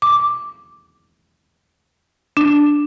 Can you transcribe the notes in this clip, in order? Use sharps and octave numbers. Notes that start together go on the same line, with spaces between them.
D6
D4